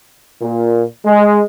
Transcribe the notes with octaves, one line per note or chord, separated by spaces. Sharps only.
A#2
G#3